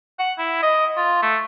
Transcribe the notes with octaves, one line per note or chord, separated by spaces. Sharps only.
F#5
E4
D#5
F4
A3